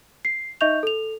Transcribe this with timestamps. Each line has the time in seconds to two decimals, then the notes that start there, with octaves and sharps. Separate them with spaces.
0.25 C7
0.61 D#4 D#5 E5 C#6 G6 F7
0.83 A4 F7